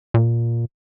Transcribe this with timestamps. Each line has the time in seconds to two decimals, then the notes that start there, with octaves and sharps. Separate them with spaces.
0.14 A#2